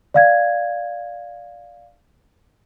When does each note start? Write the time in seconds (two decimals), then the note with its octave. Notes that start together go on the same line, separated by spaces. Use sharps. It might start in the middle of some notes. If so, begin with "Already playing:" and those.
0.14 D5 F5 G#6